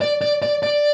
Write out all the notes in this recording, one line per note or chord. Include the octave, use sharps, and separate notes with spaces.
D5
D5
D5
D5